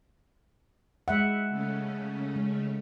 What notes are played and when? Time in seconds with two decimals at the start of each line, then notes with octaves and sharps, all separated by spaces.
1.08 G#3 E5 F#5
1.49 C#3 A3 C#4
2.36 G#3